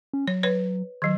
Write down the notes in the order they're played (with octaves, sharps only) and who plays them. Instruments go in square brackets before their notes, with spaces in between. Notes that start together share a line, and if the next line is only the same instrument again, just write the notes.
[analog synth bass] C#4
[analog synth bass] F#3 [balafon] C#5
[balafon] B4 C#5
D#3 F#3